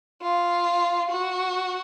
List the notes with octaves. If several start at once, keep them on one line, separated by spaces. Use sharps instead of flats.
F4
F#4